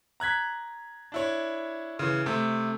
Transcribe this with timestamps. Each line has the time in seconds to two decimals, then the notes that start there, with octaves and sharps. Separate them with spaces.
0.20 A#5 F#6 G#6 B6
1.12 D4 E4 C#5
1.99 C#3 E3
2.26 C3 A3